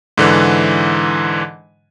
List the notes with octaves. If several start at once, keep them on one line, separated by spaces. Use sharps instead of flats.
G#2 D3 E3